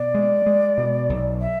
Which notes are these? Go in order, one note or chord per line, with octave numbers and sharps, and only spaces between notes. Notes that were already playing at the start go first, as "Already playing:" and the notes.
Already playing: B2 D5
G#3
G#3
B2
B1
E5